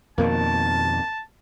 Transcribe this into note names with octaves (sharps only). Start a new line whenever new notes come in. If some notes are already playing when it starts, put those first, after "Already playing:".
F2 B2 D#3 A#3 A5